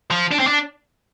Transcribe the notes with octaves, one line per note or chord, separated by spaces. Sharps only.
F3
D4
C4
D4